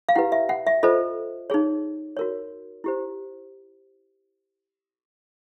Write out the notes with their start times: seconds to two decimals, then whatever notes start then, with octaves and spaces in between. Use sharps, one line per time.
0.09 F5
0.15 E4 G4 B4 F#5
0.32 E5
0.49 F#5
0.67 E5
0.83 F4 A4 C5 D#5
1.50 D#4 G#4 C#5
2.17 F#4 A#4 C#5
2.84 E4 G4 C5